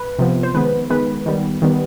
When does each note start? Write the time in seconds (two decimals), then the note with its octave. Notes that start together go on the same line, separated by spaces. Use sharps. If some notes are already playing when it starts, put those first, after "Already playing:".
Already playing: B4
0.19 C3 F3 B3
0.43 C5
0.54 D#3 G#3 B3 B4
0.90 D#3 G#3 B3 B4
1.26 D#3 G3 B3
1.62 D#3 G3 B3